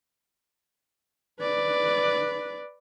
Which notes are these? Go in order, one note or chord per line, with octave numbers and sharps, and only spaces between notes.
B4 D5